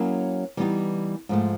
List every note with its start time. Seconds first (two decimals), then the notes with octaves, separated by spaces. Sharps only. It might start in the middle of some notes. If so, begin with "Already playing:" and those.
Already playing: F#3 A#3 C#4 E4 G#4
0.57 E3 G3 B3 D#4 G4
1.29 G#2 F3 A3